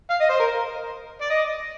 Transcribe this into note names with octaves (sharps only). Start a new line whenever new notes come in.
F5
D#5
C5
A#4
D5
D#5